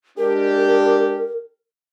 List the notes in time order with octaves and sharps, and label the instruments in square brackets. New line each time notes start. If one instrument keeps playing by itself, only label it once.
[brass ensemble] G#3 D4 G4 [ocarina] A#4